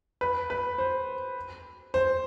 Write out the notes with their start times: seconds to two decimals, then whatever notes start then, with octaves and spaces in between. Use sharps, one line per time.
0.21 B4
0.50 B4
0.78 C5
1.94 C5